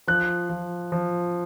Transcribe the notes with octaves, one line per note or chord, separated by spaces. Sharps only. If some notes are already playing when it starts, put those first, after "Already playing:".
F3 F#6
F3
F3